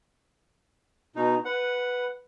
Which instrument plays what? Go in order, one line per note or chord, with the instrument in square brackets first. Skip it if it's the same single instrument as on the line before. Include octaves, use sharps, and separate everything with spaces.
[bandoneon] B2 D#4
[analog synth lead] B4 [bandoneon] F#5